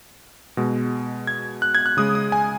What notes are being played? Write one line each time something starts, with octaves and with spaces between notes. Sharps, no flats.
B2 G#3
G#6
F#6
G#6
F#6
C#3 G#3 D#6
D#6
G#5